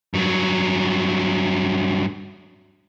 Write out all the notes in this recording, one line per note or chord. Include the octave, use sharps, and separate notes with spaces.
G2 F#3